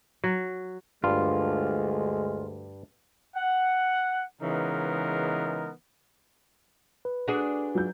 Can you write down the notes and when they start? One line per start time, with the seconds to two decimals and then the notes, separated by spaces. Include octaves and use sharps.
0.24 F#3
1.04 D2 G2 G#3 F4
3.36 F#5
4.41 C#3 E3 G#3 B3 D#4 A#4
7.05 B4
7.28 D4 F#4 G#4
7.75 F#3 G6